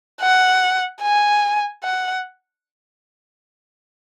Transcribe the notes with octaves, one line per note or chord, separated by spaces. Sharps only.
F#5
G#5
F#5